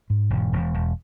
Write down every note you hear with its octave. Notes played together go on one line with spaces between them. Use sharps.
G#2
E1
E1
E1